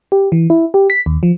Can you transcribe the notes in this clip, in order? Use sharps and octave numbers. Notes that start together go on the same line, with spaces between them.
G4
E3
E4
G4
B6
D#2
F3